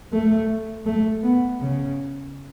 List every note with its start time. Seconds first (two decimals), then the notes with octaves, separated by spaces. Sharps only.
0.13 A3
0.86 A3
1.23 B3
1.61 C#3